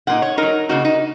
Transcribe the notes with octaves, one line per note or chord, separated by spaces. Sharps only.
A#2 A#3 D#4 F#5
C#5
F#3 D#4 A#4
C#3 A#3 D#4 F#4
D#4